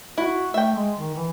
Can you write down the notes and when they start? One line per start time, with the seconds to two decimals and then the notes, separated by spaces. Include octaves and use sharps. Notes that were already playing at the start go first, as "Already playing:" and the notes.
0.18 E4 F#4
0.54 A3 E5 G5
0.76 G#3
0.99 D#3
1.15 E3